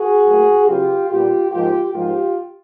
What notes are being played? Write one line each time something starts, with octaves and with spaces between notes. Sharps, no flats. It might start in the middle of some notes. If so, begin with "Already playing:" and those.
Already playing: F#4 G#4
A2 F#3 A#3
C#3 F#3 B3 F4 G4
A#2 G3 B3 F4 G4
G#2 F3 A#3 F4 G4
G#2 F3 A#3 F4 G4